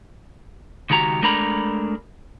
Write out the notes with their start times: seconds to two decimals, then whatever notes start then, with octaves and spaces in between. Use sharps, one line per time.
0.90 C#2 D#3 F#4 G4 A#5
1.22 G#3 A3 D4 A#4 A#5 B5